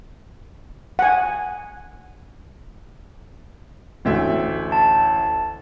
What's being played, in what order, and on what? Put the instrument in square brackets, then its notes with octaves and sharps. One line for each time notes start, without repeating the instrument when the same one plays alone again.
[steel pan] F#5 G#5
[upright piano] A1 D2 E5
[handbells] A5